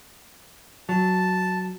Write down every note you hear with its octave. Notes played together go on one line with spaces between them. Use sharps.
F#3 A5